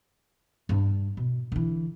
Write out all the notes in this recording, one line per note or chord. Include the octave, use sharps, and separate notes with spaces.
G2 D4
B2
D3 E3